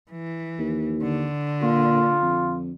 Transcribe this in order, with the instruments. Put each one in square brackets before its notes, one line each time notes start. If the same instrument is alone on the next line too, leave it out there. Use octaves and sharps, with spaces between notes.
[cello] E3
[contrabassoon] D#2
[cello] D3
[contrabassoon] A#2 [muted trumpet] F4
[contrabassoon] F2